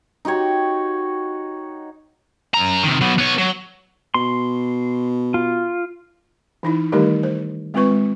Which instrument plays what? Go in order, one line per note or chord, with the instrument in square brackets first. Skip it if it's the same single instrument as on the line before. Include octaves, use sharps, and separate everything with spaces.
[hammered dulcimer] D#4 F#4 G4 C#5
[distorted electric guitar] F#2 A#5
C3 D#3
F#3 B3
B3 C#5
F#3
[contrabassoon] B2 [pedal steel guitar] C6
[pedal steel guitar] F4
[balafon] E3 D#4 E4
D#3 G3 A3 D#4 G4 A#4
C5
G#3 C4 F4 B4 C#6
G#3